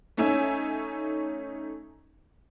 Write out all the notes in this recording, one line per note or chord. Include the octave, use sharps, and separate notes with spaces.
A3 C#4 D#4 E5 G#5